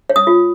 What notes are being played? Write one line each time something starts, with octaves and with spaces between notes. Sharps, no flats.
C#5
D#6
F4